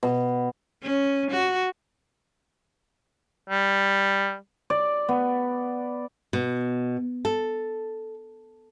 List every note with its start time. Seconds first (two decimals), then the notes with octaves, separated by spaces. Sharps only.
0.03 B2
0.83 C#4
1.31 F#4
3.50 G3
4.70 D5
5.09 B3
6.33 B2
7.25 A4